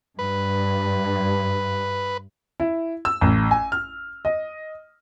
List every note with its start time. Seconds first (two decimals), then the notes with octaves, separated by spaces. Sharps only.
0.19 G2 B4
2.60 E4
3.05 E6
3.21 A1
3.51 G#5
3.72 F6
4.25 D#5